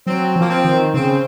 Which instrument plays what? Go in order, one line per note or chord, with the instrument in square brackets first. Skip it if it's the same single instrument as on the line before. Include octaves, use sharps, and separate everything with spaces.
[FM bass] F#3 [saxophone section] C4
[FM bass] F3 [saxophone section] A#3
[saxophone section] C4
[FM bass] D#3
[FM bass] C#3 [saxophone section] C4